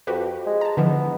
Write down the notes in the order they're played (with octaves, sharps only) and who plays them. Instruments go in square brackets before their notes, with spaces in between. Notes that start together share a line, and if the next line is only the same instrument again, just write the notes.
[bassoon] F2 [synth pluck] F#4 G4 B4
[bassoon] G#3
[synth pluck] A5 A#5
[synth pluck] D3 E3 F3 [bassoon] B3